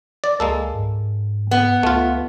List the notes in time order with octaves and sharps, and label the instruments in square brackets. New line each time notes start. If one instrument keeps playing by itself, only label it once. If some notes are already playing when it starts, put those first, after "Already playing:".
[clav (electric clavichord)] D5
[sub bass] C#2 [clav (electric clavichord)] G#3 A#3 A4
[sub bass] G#2
[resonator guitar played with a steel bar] B3
[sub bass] C#2 [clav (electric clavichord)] A3 F4